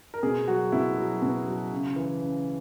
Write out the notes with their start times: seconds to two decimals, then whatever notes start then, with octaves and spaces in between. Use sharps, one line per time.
0.14 A#4
0.23 B2 G#4
0.48 F#3 F#4
0.72 B2 E4
0.97 F#3
1.22 B2
1.47 F#3
1.72 C#3
1.96 E3
2.21 C#3